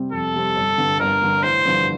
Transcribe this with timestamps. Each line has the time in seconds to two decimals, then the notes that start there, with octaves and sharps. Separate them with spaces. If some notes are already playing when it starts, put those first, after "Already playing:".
Already playing: C3 G3 C4
0.12 F2 A4
0.34 C3 G3 C4
0.56 G1
0.78 G2 D3
1.00 G1 A#4
1.22 G2 D3
1.43 A1 C5
1.65 G2 D3 F3